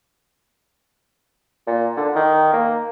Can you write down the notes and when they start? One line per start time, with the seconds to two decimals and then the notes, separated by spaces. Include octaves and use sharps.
1.67 A#2
1.97 D3
2.16 D#3
2.53 A#3